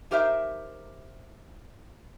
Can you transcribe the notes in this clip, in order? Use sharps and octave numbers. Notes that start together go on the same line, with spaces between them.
D#4 G4 A#4 C5 E5